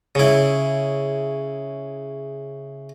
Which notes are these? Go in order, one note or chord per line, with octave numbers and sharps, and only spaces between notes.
C#3 E4